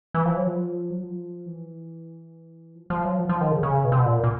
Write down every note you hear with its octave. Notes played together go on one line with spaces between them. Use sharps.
E3
F3
F#3
F3
F#3
F3
E3
F3
F3
F#3
F3
F3
D#3
C#3
C#3
B2
C3
B2
A#2
A#2